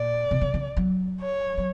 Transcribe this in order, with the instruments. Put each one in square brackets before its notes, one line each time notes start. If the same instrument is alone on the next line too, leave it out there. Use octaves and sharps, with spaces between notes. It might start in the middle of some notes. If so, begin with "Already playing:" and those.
Already playing: [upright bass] A#2 [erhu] D5
[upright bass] C3
C#3
C#3
F#3
[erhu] C#5
[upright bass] F#3